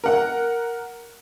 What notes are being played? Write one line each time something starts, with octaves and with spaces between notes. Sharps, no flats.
A#4 F#5